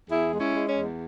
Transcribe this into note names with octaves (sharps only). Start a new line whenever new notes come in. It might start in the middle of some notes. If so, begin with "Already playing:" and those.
E2 E4 G#4
G#3
C#4 E4
G#3
C#4
E2